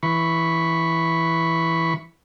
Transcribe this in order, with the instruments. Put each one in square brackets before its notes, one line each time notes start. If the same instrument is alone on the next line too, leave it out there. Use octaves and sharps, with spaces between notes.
[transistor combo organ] E3 B5 C#6